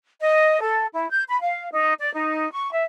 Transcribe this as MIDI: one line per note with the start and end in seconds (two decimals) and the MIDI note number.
0.20 0.60 75
0.61 0.86 69
0.93 1.08 64
1.12 1.22 91
1.28 1.38 83
1.40 1.68 77
1.71 1.93 63
1.99 2.11 74
2.13 2.50 63
2.52 2.70 85
2.71 2.84 76